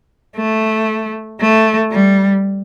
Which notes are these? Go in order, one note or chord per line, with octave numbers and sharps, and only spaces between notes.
A3
A3
G3